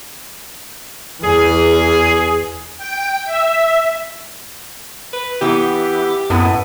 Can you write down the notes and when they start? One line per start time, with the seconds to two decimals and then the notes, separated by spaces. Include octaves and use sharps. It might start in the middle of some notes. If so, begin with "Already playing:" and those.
1.23 E2 G#4
2.77 G5
3.25 E5
5.13 B4
5.41 E3 B3 G4
6.30 F#2 A2 B3